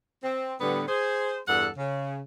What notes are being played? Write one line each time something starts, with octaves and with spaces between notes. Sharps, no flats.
C4
A2 D3 G3 B3
G#4 C5
E2 G2 A4 F#5
C#3